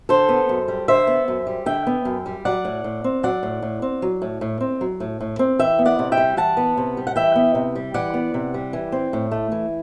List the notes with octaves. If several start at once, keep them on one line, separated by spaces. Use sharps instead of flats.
D3 A4 C5
B3
F#2
G3
D3 C5 E5
B3
F#2
G3
D3 E5 G5
B3
F#2
G3
F#3 D5 F#5
A2
A2
C4
F#3 D5 F#5
A2
A2
C4
F#3
A2
A2
C4
F#3
A2
A2
C4
E3 E5 G5
B3
D5 F#5
C3
E5 G5
G3
E3 F#5 A5
B3
C3
G3
F#5
E3 E5 G5
B3
C3
G3
E3 D5 F#5
B3
C3
G3
E3
C4
A2
A3
E3